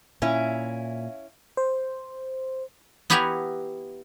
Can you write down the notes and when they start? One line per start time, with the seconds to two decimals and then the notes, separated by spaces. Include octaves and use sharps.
0.22 A#2 C#4 E4 E5 F5
1.57 C5
3.10 B3 E4 G4 F#5 G#5 A#5